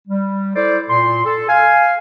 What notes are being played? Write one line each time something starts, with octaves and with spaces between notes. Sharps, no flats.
G3
E4 A4 C5 D5
A#2 C6
A4
F5 G#5